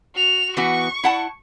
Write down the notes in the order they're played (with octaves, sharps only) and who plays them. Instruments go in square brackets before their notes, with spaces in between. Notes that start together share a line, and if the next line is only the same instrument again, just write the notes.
[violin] F#4 F7
[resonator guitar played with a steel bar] E3 B3 F#4 [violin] C#6
[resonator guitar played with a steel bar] E4 F#5 A5